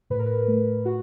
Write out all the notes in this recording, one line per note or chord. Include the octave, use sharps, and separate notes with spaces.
A2 B4
A#4
B4
A3
F#4